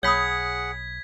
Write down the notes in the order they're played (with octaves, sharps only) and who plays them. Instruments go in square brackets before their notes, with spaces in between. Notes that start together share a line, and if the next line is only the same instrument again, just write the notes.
[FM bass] B1 [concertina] G#4 F#5 [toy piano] C#5 B5 D#6 [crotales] G#6 B6